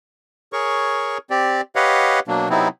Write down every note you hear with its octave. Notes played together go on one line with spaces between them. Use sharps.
G#4 A#4 C#5 C#6
C4 G4 D5
G4 B4 C#5 D#5 F5 F#5
B2 F#3 A#3 D4
C3 F#3 B3 C4 D#4 E4